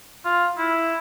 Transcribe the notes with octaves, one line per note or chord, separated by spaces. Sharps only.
F4
E4